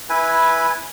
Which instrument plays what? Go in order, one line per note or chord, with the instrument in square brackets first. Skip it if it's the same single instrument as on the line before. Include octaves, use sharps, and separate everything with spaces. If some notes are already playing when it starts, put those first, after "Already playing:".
[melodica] E4 B4 G#5